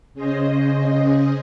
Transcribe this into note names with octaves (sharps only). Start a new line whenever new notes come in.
C#3 C#4 G#4 C5 D#5